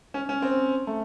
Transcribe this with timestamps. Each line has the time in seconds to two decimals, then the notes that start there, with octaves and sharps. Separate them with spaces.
0.14 C#4
0.29 C#4
0.42 C4
0.87 A3